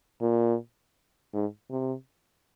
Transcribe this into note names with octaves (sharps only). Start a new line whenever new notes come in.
A#2
G#2
C3